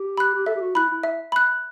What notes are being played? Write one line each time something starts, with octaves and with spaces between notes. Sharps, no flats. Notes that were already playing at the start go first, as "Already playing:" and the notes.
Already playing: G4
B5 F#6
G4
A4 E5
G4
F#4
E4 B5 F#6
E4
E5
B5 F#6